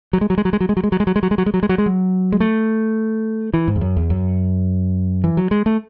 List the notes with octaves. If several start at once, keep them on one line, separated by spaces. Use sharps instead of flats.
F#3
G#3
F#3
G#3
F#3
G#3
F#3
G#3
F#3
G#3
F#3
G#3
F#3
G#3
F#3
G#3
F#3
G#3
F#3
G#3
F#3
G#3
F#3
G#3
A3
E3
G#2
E2
F#2
E2
F#2
E3
F#3
G#3
A3